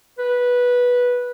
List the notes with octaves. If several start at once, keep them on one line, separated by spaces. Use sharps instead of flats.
B4